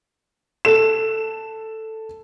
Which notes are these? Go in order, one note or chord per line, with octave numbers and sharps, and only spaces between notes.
A4 E7